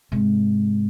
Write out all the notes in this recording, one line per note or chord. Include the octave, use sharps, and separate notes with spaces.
G#2 C3